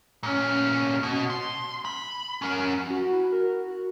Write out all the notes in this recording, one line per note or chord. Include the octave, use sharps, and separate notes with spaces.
A#2 C#4
B2
C6
B5
C#4 A#4
F#4
E4
A#4
F#4